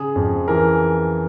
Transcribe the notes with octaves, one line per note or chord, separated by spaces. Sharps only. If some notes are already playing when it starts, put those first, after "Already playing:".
Already playing: C#3 G#4
F2
E3 A#4